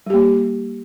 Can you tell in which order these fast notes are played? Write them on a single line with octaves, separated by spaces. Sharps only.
G3 G4 A#3